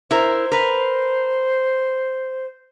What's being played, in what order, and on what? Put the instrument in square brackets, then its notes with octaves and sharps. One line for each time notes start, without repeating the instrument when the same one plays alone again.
[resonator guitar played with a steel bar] E4 A#4 [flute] C5
[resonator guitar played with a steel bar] A#4 B4